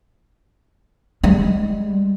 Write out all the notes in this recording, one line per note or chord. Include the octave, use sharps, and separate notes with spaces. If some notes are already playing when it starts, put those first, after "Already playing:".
G3 G#3